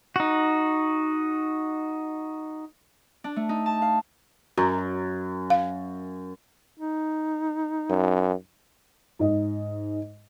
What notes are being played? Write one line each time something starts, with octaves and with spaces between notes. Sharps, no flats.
D#4 F#4
D4
A3
D#4
A5
F5
F#2 F#4
F5
D#4
F#2
G#2 D#5